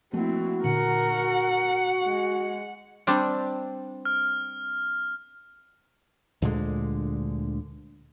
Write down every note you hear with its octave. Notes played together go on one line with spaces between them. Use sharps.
F3 A3 A#3 C4 E4 F#4
A#2 D3 A#4 F#5
G#3
G3 C4 D4
F6
D2 A#2 D3 G#3